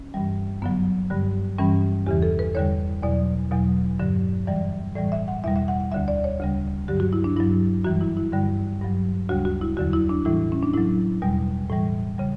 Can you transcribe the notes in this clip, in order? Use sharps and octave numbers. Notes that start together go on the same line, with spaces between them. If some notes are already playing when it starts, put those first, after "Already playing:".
Already playing: C#4
G2 E3 G3
F#2 D3 F#3 B3
G2 D3 G3
G2 E3 G3 C#4
E2 C#3 E3 G4
A4
B4
E2 D3 G3 C#5
E2 B2 F#3 D5
E2 B2 F#3
G2 D3 F#3
F#2 E3 G3 D5
A2 E3 G3 D5
E5
F#5
E2 B2 G3 E5
E5
F#5
F#5
D2 D3 G3 E5
D5
C#5
D2 C#3 G3
G2 D3 F#3 G4
F#4
E4
D4
G2 F#3 E4
F#2 E3 G3 F#4
E4
E4
G2 D3 G3
G2 F#3
D2 C#3 G3 F#4
F#4
E4
E2 D3 F#3 F#4
E4
D4
A2 E3 G3 E4
C#4
D4
A2 F#3 E4
E2 B2 G3
A2 E3 G3
C#3 G3